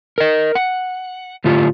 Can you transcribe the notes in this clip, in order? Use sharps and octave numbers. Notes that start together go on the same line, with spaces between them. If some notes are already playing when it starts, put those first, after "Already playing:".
A#4 D#5
F#5
A2 D3 A3 F4 G4